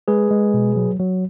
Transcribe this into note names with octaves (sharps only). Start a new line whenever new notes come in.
G#3 G#4 B4
G#3
B2
F#3
F#3